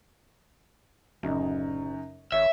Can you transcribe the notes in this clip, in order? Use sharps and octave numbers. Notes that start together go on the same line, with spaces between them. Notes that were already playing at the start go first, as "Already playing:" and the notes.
D1 F#2 C#3 D#4
G#1 C#5 E5